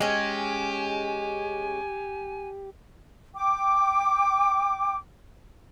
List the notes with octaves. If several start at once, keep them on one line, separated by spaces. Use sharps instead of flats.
G#3 C#4 G4 G#5
G5 D6